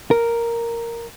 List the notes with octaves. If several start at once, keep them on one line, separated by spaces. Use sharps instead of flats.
A#4